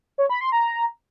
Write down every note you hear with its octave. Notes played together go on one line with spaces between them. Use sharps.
C#5
B5
C6
A#5